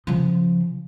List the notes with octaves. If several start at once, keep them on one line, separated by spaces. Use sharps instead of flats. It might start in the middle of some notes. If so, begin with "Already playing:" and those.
C#3 F3